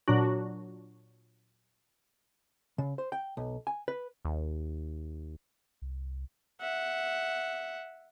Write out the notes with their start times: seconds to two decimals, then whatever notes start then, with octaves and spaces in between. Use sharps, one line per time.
0.08 A#2 F#3 D4 F#4
2.78 C#3
2.98 C5
3.12 G5
3.37 B1
3.67 G#5
3.88 B4
4.25 D#2
5.82 C2
6.61 E5 F#5